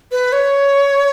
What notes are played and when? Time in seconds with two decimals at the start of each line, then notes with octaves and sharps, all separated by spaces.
0.12 B4
0.33 C#5